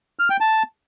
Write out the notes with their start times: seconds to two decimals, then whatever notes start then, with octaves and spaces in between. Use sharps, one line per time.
0.19 F6
0.30 G5
0.40 A5